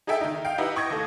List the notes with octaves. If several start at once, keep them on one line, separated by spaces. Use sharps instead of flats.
D#4 G#4 A4 E5 G5
D#3 D#4
F5 G5
D#4 E4 G4 B4 D#5 F#5
G5 C#6 D#6 G#6 A#6
D#2 A3